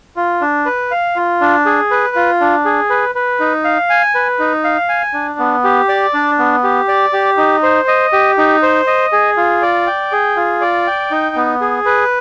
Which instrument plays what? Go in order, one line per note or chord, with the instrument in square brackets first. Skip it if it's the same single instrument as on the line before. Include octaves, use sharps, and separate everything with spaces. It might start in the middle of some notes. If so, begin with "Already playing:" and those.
[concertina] F4
D4
B4
F5
F4
D4
G#4
B4
F4
D4
G#4
B4
B4
D#4
F5
G#5
B4
D#4
F5
G#5
D4
B3
G4
D5
D4
B3
G4
D5
G4
D#4
C5
D#5
G4
D#4
C5
D#5
G#4
F4
D5
G5
G#4
F4
D5
G5
D#4
B3
G#4
B4